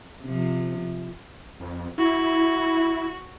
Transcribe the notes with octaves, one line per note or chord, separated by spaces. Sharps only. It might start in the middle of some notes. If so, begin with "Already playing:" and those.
C3 F3
F2
E4 F#4